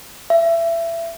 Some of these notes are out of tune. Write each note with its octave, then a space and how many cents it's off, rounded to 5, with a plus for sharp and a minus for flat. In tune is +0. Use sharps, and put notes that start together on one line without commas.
E5 +25